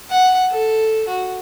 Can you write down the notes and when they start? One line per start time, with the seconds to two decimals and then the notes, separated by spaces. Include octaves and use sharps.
0.10 F#5
0.51 A4
1.08 F#4